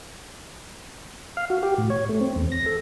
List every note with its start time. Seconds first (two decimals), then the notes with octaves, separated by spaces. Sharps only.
1.37 F5
1.50 F#4
1.63 G4
1.78 A2
1.90 C#5
2.09 A3
2.21 C4
2.36 E2
2.52 A#6
2.66 A4